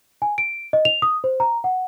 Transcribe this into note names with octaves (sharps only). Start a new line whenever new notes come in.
G#5
D7
D#5
F7
D#6
C5
A#5
F#5